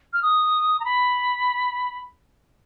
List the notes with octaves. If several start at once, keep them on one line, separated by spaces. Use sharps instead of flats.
F6
D#6
A#5
B5